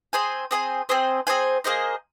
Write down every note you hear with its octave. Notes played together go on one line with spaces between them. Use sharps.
C4 G#4 C5 G#5
C4 G#4 C5 G#5
C4 G#4 C5 G#5
C4 G#4 C5 G#5
A#3 G#4 C5 D#5